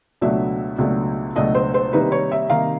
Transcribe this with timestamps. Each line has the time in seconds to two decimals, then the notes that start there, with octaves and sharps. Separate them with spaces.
0.21 C#2 B2 F#3 A3 D4 E5
0.78 C#2 B2 F#3 A3 D4
1.36 C#2 B2 F#3 A3 D4 D#5
1.55 C5
1.74 C5
1.93 C3 D#3 G3 A#3 D#4 B4
2.12 C#5
2.32 E5
2.50 C3 D#3 G3 A#3 D#4 F5